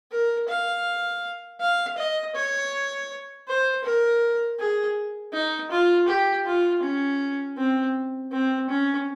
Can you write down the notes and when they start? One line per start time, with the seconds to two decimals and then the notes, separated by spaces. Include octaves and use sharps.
0.12 A#4
0.48 F5
1.60 F5
1.98 D#5
2.35 C#5
3.48 C5
3.84 A#4
4.59 G#4
5.33 D#4
5.71 F4
6.08 G4
6.46 F4
6.83 C#4
7.58 C4
8.32 C4
8.70 C#4